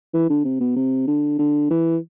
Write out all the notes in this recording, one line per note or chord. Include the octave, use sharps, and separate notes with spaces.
E3
D3
C3
B2
C3
D3
D3
E3